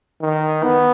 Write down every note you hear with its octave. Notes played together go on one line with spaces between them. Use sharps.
D#3
B3